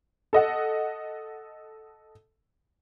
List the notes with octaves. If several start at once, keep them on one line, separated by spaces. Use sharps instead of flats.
A4 D#5 F#5